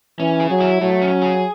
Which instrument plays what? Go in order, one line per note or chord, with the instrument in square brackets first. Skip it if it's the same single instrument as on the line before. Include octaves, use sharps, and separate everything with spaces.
[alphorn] E3 [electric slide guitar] C#4
[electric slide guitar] G#4
[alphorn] F#3
[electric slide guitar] E4
[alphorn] F#3 [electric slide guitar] A3
[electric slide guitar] C#4
G#4